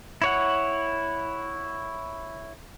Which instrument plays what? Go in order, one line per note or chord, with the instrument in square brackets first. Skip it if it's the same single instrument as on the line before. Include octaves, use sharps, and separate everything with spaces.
[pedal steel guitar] E4 C#5 F#5